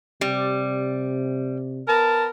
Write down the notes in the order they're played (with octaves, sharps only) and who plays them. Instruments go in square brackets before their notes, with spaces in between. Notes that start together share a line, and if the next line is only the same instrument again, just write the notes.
[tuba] C3 [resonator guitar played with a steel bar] G3
[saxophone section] B3 A#4 [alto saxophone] A5